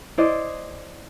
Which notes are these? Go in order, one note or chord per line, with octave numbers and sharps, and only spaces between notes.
E4 C5 D5 D#5